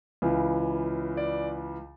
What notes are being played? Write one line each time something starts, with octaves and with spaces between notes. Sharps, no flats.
C#2 C#3 E3
D5